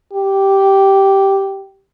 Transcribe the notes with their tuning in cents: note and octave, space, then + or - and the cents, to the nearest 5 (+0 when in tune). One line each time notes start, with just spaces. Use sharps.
G4 -10